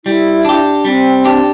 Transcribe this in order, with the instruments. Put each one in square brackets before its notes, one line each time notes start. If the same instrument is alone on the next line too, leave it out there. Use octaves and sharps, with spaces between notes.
[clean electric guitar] G3 [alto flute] E4
[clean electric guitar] D4 G4
[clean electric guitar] G3 [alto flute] C4
[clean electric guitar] D4 G4